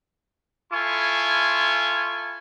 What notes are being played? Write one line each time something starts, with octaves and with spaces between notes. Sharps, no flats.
E4 F4 A4 G#5 C6 C#6